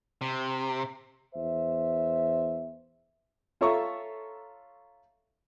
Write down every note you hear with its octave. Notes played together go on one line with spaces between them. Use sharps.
C3
E2 C5 E5
F4 A4 C#5 E5 A#5 C#6